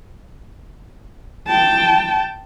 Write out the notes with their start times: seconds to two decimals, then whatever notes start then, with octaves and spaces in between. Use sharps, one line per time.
1.47 G5 A5